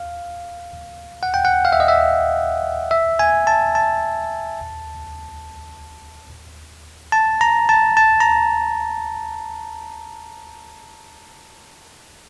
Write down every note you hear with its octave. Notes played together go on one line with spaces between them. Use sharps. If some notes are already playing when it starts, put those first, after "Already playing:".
Already playing: F5
F#5
G5
F#5
F5
E5
D#5
E5
E5
G#5
A5
A5
A5
A#5
A5
A5
A#5